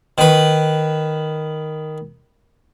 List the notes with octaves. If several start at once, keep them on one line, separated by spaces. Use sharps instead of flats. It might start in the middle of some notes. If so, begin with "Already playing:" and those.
D#3 B4